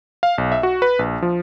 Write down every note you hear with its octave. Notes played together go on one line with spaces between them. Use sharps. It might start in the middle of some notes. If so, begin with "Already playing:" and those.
F5
B1
E5
F#4
B4
A#1
F3